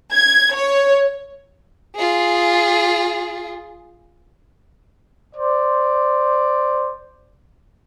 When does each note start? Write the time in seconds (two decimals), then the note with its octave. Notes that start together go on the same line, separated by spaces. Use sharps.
0.13 G#6
0.54 C#5
1.96 F4 G#4
5.34 C5 D5